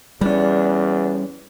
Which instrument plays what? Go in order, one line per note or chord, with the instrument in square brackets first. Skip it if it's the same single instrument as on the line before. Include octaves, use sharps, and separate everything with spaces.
[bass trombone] E2 [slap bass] G3 C#4 [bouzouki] D4